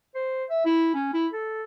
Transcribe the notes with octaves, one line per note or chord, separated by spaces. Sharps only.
C5
E5
E4
C#4
E4
A4